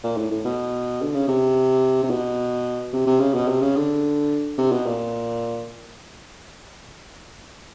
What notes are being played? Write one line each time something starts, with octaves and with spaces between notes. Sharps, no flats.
A#2
A2
A2
B2
D3
C#3
C3
C3
B2
C3
C3
C#3
B2
C3
C#3
D3
C3
B2
A#2